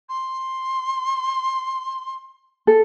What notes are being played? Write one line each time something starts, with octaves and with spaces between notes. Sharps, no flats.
C6
A4